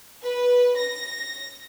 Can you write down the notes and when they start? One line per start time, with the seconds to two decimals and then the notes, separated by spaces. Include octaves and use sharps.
0.22 B4
0.77 A#6